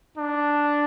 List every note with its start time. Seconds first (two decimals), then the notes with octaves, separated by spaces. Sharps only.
0.17 D4